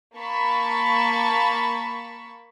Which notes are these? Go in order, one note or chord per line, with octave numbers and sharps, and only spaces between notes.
A#3 A5 B5 C#6